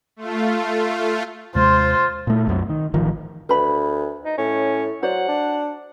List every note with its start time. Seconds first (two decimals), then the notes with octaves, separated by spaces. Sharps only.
0.16 A3 F4
1.55 D#2 C3 G#3 F4 C5
2.27 A#2 A3
2.47 C2 F#2 C3
2.69 D#3
2.94 A1 D#3 F3
3.49 D2 B4 B5
4.25 D#4
4.38 A2 C#4
5.03 F#3 C5 D5 F#5
5.28 D4